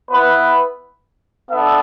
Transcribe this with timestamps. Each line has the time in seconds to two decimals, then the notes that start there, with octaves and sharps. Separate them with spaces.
0.10 B3 E4 B4
1.50 B3 D4 A4 E5